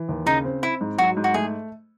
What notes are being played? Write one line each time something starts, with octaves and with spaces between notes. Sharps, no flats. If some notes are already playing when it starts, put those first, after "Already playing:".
Already playing: E3
D#2
C#3 D#4
C4
C4 E4
G#2
F#3 F#4
G#2
F#4
A3 G#4